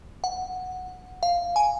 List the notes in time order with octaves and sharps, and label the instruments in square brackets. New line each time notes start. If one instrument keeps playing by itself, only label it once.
[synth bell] F#5
F5
G#5